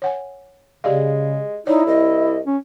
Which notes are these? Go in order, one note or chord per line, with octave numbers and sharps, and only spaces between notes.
C#5 F#5 G#5
C#3 G#3 G4 D5 F5
D#4 E4 C#5 D5
C2 D#5
C#4